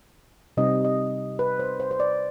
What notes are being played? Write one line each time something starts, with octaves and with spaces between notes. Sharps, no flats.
C3 G3 C4 D#4 D#5
D#5
B4
C5
C5
C5
D5